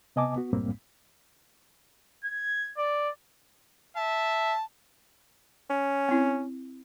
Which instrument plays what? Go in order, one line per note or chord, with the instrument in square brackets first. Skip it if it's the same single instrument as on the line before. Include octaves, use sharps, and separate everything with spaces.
[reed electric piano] C3 B3 D#5 G#5 A5 D6
B3 F#4
C2 F#2 A2 G3 A#3 C4
[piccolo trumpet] G#6
D5
[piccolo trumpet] E5 [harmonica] A5
[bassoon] C#4
[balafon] C4 E4